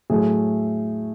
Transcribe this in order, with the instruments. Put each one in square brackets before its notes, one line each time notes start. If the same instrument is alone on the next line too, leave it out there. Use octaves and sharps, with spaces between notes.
[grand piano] A2 F#3 A3 G#4